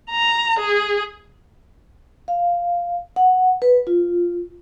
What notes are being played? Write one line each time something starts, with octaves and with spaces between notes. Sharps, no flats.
A#5
G#4
F5
F#5
B4
F4